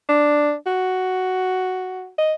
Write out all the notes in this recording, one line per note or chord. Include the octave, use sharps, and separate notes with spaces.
D4
F#4
D#5